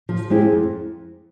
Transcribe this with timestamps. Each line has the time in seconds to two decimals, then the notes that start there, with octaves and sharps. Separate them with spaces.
0.09 F3
0.30 G#3 C4 E4 G4
0.52 F2